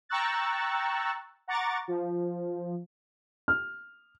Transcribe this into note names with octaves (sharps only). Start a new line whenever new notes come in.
G5 A#5 C#6 E6 F#6 A6
F#5 A#5 C#6 D6 A6
F3
F6